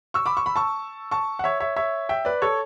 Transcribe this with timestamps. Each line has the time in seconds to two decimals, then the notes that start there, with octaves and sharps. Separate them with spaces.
0.14 C#6 E6
0.26 B5 D6
0.37 C#6
0.46 B5
0.56 A5 C#6
1.11 A5 C#6
1.39 F#5
1.44 C#5 E5
1.60 C#5 E5
1.76 C#5 E5
2.09 E5 G5
2.25 B4 D5
2.42 A4 C#5